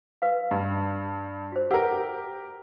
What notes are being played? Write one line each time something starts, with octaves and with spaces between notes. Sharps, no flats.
A#4 B4 F5
G2
F#4 C5
G4 A#4 B4 F#5 E6